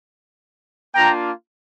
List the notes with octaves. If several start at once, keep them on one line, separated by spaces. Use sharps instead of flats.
A#3 D4 F4 G5 A#5